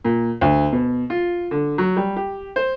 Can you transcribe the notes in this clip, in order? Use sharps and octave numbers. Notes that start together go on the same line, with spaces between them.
A#2
D2
B2
F4
D3
F#3
G3
G4
C5